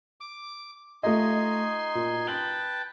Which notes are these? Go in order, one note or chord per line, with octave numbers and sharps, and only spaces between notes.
D6
A3 D#4 F4 D#5 G#5 C6
A#2
B4 G5 A5 F#7 G7